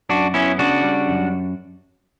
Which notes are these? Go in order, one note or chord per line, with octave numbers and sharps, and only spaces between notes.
F#2 D4 F#4
B3 C#4 E4
C#3 D4 F#4
G3
F#2